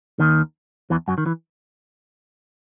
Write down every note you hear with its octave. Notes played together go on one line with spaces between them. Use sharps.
D#2 D#3
E2 E3
F#2 F#3
D#3
E3